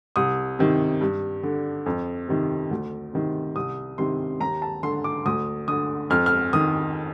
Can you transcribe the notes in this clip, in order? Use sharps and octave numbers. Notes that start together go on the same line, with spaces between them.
C2 D#6
C3 D#3
G2
D3
F2
C3 D#3
D2
C3 D#3
C2 D#6
C3 D#3 C6
D#2 A#5
A5
D3 C6
D6
D2 D#6
D3 D#6
F2 F6
F6
D#3 D#6